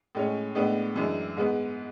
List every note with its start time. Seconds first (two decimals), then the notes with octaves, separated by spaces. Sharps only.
0.15 A2 G#3 C#4
0.55 A2 G#3 B3 D4
0.96 F#2 E3 G#3 D4
1.37 G#2 G#3 B3